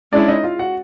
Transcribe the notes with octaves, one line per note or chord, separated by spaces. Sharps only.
G#3 C#4 D4 E4 D5
D#4 D#5
F4 F5
F#4 F#5